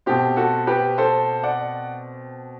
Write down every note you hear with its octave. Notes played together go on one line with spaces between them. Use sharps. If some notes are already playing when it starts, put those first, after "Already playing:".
B2 A3 C4 G4
F#4 A4
G4 B4
A4 C5
D5 F#5